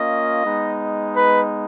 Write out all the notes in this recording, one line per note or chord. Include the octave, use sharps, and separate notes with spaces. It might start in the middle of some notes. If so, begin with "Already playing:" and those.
Already playing: A#3 C#4 F4 D#5
G#3 B3 D#4
B4